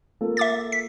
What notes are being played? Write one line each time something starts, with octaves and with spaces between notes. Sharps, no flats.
A#3 F4 A4
E5 D6 A6
B6